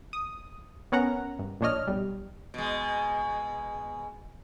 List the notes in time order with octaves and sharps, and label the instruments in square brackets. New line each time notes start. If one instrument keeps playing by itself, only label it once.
[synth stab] D#6
B3 C#4 A#4 F#5 A#5
G2
A#1 A#2 D4 C#5 D#5 F6
B1 G3
[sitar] B2 G#3